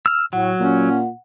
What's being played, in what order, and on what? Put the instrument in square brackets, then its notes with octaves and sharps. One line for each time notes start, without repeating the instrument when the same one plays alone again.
[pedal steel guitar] E6 F6
[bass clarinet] A2 [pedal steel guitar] F#3 [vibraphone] F#5
[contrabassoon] A#2 [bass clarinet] C#4